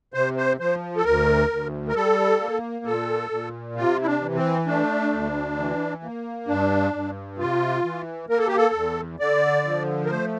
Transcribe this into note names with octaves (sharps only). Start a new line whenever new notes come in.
C3 C5
C5
F3 C5
A4
D2 A#4
D2
A#4
G3 A4
A#3
A#2 A4
A#2
C3 F4
E4
D4
E3
C4
A3 D4
D2
E3
A#3
G2 D4
G2
C3 F4
E3
A#3 A#4
A4
G4
A4
E2
D3 D5
F3
A#4
A3 C5